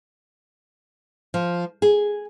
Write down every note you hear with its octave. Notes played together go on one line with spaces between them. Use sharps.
F3
G#4